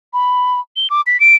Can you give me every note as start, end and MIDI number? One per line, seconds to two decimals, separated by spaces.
0.13 0.60 83
0.76 0.90 103
0.90 1.01 86
1.07 1.20 95
1.20 1.36 98